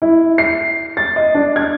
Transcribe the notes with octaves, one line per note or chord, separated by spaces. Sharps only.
E4
C7
A6
D#5
D4
G#6